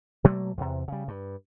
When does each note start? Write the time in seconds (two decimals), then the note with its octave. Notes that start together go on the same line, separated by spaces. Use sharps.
0.24 B2 F#3 A3 A#3
0.57 E2 C3
0.88 C#3 G3
1.08 G2